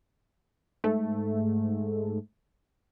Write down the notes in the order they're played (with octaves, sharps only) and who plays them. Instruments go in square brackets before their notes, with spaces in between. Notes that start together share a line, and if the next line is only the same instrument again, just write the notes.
[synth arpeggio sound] G#2 A3